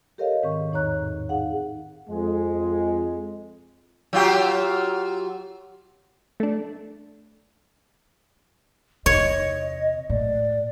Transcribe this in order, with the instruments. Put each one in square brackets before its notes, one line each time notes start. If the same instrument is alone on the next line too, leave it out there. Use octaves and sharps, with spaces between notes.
[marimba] G4 A4 A#4 C#5 D#5 F5
G#2 D#3 C4 C#6
E2 A2 D#4 C#5 A#5 F#6
D#4 G#4 F5 F#5
[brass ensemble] F2 G#3
[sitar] F#3 F4 G4
[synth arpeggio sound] A3 D4
[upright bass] E2 C3 [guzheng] C#5 [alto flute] D#5
[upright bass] A2 [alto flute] D5